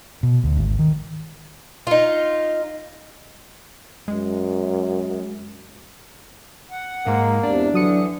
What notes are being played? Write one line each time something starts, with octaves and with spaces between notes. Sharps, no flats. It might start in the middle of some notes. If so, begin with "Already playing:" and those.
B2
D2
G#1
D#3
D#4 F4
F#2 G#3
F#5
G#2 G#3 A#3
E2 C3 D4
D3 E3 F#3 D#6 C#7